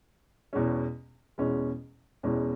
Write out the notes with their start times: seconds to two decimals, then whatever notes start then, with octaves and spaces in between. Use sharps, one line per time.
0.53 E2 B2 G#3 C#4
1.38 E2 B2 G#3 C#4
2.23 E2 B2 G#3 C#4